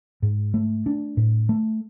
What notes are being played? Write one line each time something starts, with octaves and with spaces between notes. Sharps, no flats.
G#2
A3
D4
A2
A3